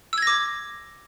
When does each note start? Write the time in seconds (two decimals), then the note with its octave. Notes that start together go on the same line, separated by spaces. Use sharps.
0.13 E6
0.18 G#6
0.22 A#6
0.27 D6